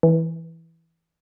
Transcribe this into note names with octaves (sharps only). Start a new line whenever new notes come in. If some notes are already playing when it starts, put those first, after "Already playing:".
E3